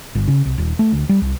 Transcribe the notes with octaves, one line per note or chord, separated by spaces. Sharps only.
G1
C#3
C2
D#1
A3
D2
G3
C2